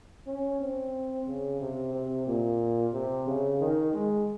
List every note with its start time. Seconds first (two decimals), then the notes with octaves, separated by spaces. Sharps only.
0.27 C#4
0.61 C4
1.27 C#3
1.60 C3
1.94 C3
2.27 A#2
2.93 C3
3.27 C#3
3.60 D#3
3.93 G#3